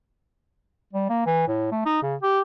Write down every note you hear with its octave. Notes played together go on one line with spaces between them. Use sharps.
G3
A#3
E3
A2
A3
D#4
C#3
G4